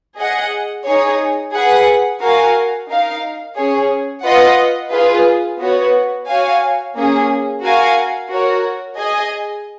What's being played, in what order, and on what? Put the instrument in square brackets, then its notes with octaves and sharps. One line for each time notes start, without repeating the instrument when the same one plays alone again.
[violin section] G#4 D#5 F#5
D#4 G#4 C#5
G#4 B4 F#5
F#4 A#4 F5 G#5
D#4 A#4 F5
C#4 G#4 C#5
F4 B4 D#5 F#5
F4 G#4 B4
B3 F#4 C#5
F#4 C#5 F5 G#5
A#3 C#4 G#4
F#4 A#4 F5 G#5
F#4 A#4 C#5
G#4 D#5 G#5